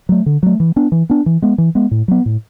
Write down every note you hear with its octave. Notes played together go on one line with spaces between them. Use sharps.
F#3 A3
D3
F#3 A3
E3
B3 D4
E3
B3 D4
E3
G#3 B3
E3
G#3 B3
A2
F#3 B3
A2